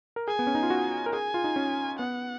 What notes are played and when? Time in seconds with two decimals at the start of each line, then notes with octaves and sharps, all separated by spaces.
0.16 A#4
0.28 G#4 G#5
0.39 B3
0.47 C#4
0.55 D#4
0.63 F4
0.70 F#4
1.06 A#4
1.13 G#4 G#5
1.34 F4
1.44 D#4
1.56 C#4
1.99 B3 F#5